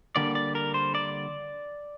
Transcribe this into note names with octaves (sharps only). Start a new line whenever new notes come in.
D3 G3 A#3 D5
D5
A#4
C5
D5